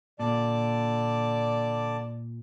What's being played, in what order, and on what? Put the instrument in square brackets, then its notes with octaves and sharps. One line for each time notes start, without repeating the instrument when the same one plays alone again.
[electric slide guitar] A#2 [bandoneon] D3 A5 D6 [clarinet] D5